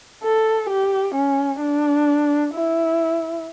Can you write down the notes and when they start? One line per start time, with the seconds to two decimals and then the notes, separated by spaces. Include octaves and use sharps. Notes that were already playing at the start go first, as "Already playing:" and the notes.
0.23 A4
0.69 G4
1.15 C#4
1.61 D4
2.54 E4